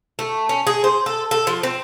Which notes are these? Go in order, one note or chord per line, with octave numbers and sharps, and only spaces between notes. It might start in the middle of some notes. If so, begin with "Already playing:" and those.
A3
C#4
G#4
C5
A4
A4
F3
C4